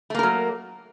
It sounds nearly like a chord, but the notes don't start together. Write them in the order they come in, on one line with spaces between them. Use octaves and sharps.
A3 A#3 A#4 F#3